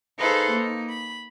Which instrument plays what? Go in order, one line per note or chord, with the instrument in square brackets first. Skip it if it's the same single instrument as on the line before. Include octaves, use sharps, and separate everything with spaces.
[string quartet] D#4 G#4 A4 B4 C5 F5
A#3 D#4
B5